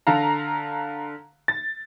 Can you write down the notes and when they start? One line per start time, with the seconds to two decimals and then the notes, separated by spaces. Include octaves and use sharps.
0.07 D3 A4 F5 A#5
1.48 A6